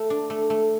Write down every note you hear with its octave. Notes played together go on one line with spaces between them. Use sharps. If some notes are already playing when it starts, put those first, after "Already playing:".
Already playing: A3
D4
A3
A3